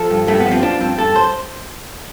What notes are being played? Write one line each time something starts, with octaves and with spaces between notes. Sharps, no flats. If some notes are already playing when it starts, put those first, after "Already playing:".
Already playing: F3 A4
G2
G2 A3
B3
F3
C4
F3 D4
G2 C4
G2 A4
C5